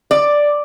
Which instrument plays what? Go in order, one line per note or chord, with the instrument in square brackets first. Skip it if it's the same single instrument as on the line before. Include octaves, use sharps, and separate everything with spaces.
[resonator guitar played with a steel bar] D5